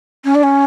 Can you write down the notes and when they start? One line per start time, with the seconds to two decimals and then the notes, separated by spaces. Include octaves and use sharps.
0.25 C#4
0.35 D4
0.43 C#4